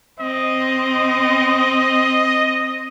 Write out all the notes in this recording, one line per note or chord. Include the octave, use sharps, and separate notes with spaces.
C4 D#5